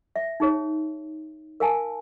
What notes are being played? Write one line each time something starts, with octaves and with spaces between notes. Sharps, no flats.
E5
D#4 G#4 C#5
A#4 F5 G#5 A5